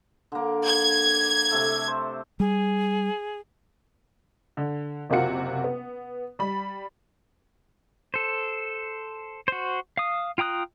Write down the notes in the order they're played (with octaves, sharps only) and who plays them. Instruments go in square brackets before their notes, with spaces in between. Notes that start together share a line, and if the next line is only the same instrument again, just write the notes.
[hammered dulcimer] D3 A#3
[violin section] G#6
[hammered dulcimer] C3 A3 A4
C5
[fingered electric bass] G3 [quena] G#4
[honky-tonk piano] D3
F#1 C3 A#3 F4 F#4 C#7
B3
G3 B5
[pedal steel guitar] A4 C5
F#4 C5
F5 D#6
F4 G5 A#5 D#6 F#6